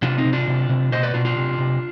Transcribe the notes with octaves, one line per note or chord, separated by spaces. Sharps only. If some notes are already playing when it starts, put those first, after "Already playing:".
C3 D4 F4
C4 D#4
C3
D4 F4
C3
C3
B2 C5 D#5
B4 D5
B2 D4 F4
D4 F4
C3
C3